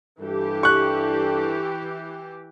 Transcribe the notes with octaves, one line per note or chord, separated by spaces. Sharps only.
G2 E3 G4 A4
C#6 F#6